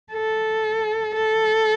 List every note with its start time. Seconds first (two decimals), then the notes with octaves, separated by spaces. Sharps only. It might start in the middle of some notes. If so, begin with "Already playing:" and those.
0.13 A4
1.15 A4